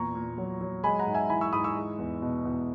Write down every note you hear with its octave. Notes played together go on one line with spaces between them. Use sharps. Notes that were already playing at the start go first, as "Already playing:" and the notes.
Already playing: E2 A#2 A#5 C#6
A#2
F#3
F#3
G#3 G#5 B5
F#5 A#5
G#2
E5 G#5
E3 G#5 B5
C#6 E6
G#2 B5 D#6
C#6 E6
G#3
E2
B2
E2